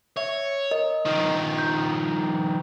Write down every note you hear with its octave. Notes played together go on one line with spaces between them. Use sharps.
C#5 E5
A#4 D#5
D#3 F3
G6